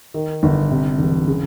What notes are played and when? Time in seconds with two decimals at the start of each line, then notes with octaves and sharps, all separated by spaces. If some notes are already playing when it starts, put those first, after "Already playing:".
0.14 D#3
0.43 G1
0.71 C3
0.99 E1
1.27 C#3